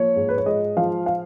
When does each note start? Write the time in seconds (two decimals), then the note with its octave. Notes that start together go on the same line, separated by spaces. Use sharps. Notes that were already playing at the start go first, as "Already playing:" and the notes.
Already playing: F3 A#3 C#5
0.16 G#2
0.29 B4
0.38 C#5
0.46 G#3 D#5
0.77 F3 F5
1.06 F5